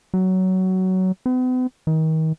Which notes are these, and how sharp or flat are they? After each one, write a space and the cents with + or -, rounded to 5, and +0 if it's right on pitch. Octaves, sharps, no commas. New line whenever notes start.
F#3 +15
B3 +45
D#3 +35